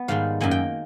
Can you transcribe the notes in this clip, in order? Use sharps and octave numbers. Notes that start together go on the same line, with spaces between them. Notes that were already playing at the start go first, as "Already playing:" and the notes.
Already playing: B3
G#2 D#3 G3 F5
F#2 D#3 F#3 A#3 G#5
G5